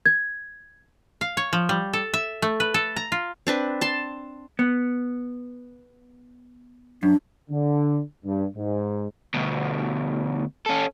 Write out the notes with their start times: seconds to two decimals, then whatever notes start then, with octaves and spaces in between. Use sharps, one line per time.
0.06 G#6
1.21 F5
1.37 C#5
1.53 F3
1.69 G3
1.93 A4
2.14 E5
2.42 A3
2.60 B4
2.74 A4
2.96 A#5
3.12 F4
3.47 C4 D4 B4
3.81 A5 C6
4.59 B3
7.03 F#2 D4
7.50 D3
8.24 G2
8.56 G#2
9.34 D2 B2
10.66 C#4 A4